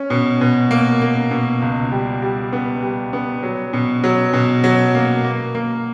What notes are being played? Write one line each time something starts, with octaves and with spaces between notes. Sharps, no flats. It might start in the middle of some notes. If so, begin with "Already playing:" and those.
Already playing: C#4
B2
B2
A#3
A#3
B2
C#2
G3
G3
B3
G3
B3
F#3
B2
F#3
B2
F#3
A#3
A#3
A#3